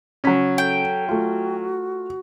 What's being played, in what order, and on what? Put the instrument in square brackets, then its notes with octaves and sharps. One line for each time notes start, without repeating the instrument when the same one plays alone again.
[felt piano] C#3 B6 [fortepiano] F#3 C#4
[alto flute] A4 [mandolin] G5
[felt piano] A3 F4 [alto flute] F#4